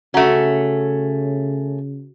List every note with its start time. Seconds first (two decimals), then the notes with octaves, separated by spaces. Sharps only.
0.14 C#3 A3 C#4 F#4 F#5 A#5